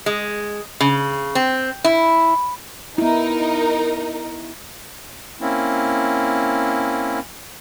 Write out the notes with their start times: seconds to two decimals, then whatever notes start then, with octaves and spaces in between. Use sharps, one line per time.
0.06 G#3
0.80 C#3
1.35 C4
1.84 E4
2.98 B3 D#4 E4 A#4
5.41 A#3 C4 C#4 E4